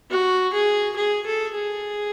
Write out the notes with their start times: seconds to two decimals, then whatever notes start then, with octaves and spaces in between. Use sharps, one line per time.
0.10 F#4
0.53 G#4
0.96 G#4
1.26 A4
1.55 G#4